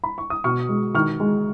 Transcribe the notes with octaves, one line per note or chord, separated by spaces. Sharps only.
B5
C#6
D#6
B2 C#6 F6
G#3
D#3 C#6 F6
G#3